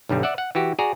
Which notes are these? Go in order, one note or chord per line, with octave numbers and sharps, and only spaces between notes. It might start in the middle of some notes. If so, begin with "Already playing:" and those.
B1 G2 D3 G3
D5 E5 F#5
F#5
E3 F#4 G4
F#4 G#4 D5 A#5